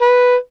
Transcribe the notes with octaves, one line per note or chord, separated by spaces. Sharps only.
B4